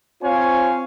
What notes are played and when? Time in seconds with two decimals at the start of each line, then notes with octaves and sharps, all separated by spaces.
0.22 C4 F4 C5 C#5 F5 G#5